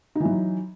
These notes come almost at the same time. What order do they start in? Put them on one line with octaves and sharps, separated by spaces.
D#4 E3 F#3